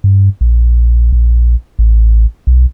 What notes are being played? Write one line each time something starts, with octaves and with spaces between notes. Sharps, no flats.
G2
A#1
A#1
A1
B1